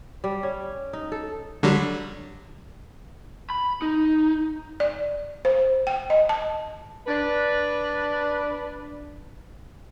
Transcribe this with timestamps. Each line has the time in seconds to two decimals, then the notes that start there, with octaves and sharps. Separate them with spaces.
0.24 G3
0.43 C#4
0.93 D#4
1.12 A4
1.63 D3 F#3 G3
3.50 B5
3.82 D#4
4.80 D5
5.45 C5
5.87 G5
6.10 D#5
6.29 A5
7.07 D4 B4